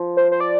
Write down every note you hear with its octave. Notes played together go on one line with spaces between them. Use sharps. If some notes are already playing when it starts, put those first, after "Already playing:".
Already playing: F3
C5
C5
D5